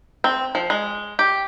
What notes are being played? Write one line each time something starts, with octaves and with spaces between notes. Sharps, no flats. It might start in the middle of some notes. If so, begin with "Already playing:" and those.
C4
F3
G#3
G4